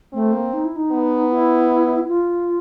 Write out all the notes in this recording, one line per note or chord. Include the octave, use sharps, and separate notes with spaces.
A3 C4
A#3
D#4
E4
D#4
B3
E4
F4